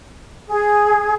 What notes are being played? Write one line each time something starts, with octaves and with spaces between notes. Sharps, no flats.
G#4